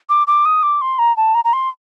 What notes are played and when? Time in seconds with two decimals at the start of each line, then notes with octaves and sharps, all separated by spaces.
0.09 D6
0.27 D6
0.45 D#6
0.63 D6
0.81 C6
0.99 A#5
1.17 A5
1.34 A#5
1.45 A#5
1.53 C6